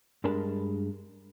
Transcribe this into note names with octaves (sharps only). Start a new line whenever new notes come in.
G2 G#3 D4 A#4 A5 B5